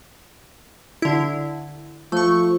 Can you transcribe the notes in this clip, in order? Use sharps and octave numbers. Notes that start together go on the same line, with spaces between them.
D3 E4
F3 A3 C#6